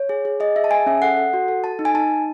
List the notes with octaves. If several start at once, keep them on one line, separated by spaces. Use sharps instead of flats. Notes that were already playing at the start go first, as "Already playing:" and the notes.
Already playing: C#5
G#4
G#4
G#4 D#5
G#4 E5
A5
G#4 G#5
C#4 E5
A4 F#5
A4
F#4
A4
A4 A5
D#4
G#5
D#4 A5
D#4